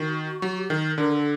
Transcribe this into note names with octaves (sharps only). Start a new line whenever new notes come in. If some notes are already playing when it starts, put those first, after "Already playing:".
Already playing: D#3 F#4
F#3 G4
F#4
G4
D#3 A#4
D3 A#4
A4